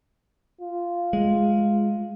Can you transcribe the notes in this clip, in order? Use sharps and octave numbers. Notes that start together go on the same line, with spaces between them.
F4
G#3